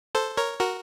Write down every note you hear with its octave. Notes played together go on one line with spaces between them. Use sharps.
A4 C5
A#4 C#5
F#4 A#4